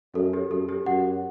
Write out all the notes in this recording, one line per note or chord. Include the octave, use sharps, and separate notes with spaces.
F#2 A4
G4
F#2 A4
G4
F#2 F#5